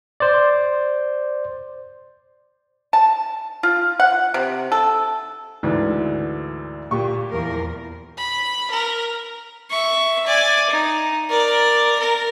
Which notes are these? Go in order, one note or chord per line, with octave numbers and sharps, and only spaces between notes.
C5 D5
A5
F4
F#5
C3
A4
D2 G#2 E3
A#2 G4 C#6
E2 F3 A#4
B5
A#4
E5 C#6
D5 G#5
D#4
A#4 D5
A#4